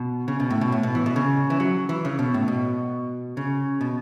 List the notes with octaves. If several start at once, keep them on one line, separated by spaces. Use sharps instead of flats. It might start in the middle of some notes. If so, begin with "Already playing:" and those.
Already playing: B2
C#3
B2
A2
B2
A2
B2
E3
B2
C#3
E3
F#3
E3
C#3
B2
A2
B2
C#3
B2